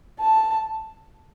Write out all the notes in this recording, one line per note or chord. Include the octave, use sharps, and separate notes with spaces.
A5